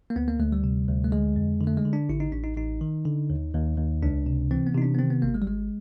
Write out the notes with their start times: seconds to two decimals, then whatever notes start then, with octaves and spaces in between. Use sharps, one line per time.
0.10 A#3
0.16 D2 B3
0.28 A#3
0.40 D2 A3
0.52 G3
0.64 C3
0.89 D2
1.04 A3
1.12 D3 G#3
1.36 F2
1.60 D3
1.67 A3
1.77 G#3
1.85 D3
1.93 D4
2.09 A1 E4
2.20 D#4
2.32 A1 D4
2.44 D#4
2.57 A1 D#4
2.81 D#3
3.05 D3
3.30 D#2
3.54 D#2
3.78 D#2
4.03 C#2 D4
4.26 C3
4.51 E3 C4
4.67 B3
4.75 C3 D#4
4.82 D4
4.94 B3
4.99 D#3 C4
5.10 B3
5.22 G#1 A#3
5.35 G#3
5.42 G3
5.47 G#1 G#3